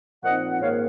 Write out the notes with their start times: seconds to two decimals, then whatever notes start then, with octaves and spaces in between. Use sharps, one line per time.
0.23 A#2 F3 C4 D#4 D#5 F#5
0.52 F#5
0.61 G#2 D#3 A#3 C#5 F5